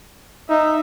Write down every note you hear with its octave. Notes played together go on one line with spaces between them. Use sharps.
D#4 E5